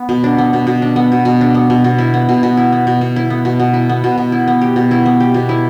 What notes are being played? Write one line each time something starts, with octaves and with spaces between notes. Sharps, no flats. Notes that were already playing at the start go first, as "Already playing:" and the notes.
Already playing: B3
B2
D4
B3
B2
B2
D4
B3
B2
B2
D4
B3
B2
B2
E4
B3
B2
B2
E4
B3
B2
B2
E4
B3
B2
B2
E4
B3
B2
B2
E4
B3
G4
B2
E4
B3
G4
B2
E4